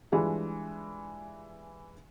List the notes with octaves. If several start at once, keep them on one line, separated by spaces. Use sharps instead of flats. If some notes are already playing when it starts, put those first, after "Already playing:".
E3 G3 G#3 D4 F4 G#4